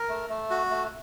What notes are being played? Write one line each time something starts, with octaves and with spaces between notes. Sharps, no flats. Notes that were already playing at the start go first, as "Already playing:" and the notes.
Already playing: A#4
A3
A3
F#4
A3